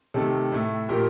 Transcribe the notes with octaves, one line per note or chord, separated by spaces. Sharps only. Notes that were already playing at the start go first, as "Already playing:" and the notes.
C3 D#3 A3 A4
A2 A3
A#2 F3 A3 G4 A#4